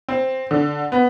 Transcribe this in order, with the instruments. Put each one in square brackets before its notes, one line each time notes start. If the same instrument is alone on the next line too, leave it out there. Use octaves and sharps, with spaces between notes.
[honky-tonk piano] C4
D3
B3